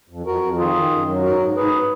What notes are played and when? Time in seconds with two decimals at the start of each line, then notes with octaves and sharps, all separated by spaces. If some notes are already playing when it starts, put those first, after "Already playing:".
0.09 F2
0.26 F2 F#4 A#4
0.42 F2
0.58 D#3 F4 G#4
0.75 D#3
0.91 F#2
1.08 F#3
1.23 G#2 F#4 A#4
1.39 G#2
1.56 G#2 G#4 B4